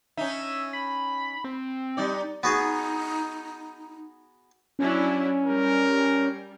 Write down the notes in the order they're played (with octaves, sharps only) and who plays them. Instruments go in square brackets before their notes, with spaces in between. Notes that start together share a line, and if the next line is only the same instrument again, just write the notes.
[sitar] C#4 D#4 [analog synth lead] E5
[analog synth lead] B5
C4
[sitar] G3 D#4 D5
[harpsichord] B3 F#4 G#4 [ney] D#4
[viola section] F#3 D4 E4 [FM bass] C#4
[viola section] G3 [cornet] A#4